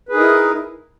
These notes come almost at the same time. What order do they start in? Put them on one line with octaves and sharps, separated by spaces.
B4 G#4 D#4 A#4 E4